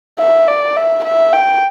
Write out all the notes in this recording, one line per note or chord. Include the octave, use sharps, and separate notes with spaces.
E5
D5
E5
E5
G5